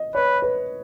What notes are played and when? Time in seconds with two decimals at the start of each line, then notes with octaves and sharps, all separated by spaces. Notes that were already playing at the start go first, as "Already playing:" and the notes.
Already playing: D#5
0.15 B4 C#5
0.42 B4